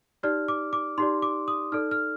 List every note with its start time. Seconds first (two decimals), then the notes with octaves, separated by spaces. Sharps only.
0.23 D#4 G4 D5 F6
0.48 D6
0.73 D6
0.98 D#4 G4 D5 C6
1.22 D6
1.48 D#6
1.72 D#4 A4 D5 F6
1.91 F6